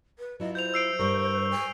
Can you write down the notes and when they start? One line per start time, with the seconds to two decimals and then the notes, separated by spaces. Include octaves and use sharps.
0.19 B4
0.40 F#3 E4 F4 D#5
0.55 C5 G6 F7
0.74 E6 C7 D7
1.00 G2 G3 A#4 C#6
1.51 G#5